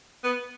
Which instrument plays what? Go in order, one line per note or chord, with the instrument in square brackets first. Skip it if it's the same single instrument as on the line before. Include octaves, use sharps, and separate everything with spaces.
[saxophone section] B3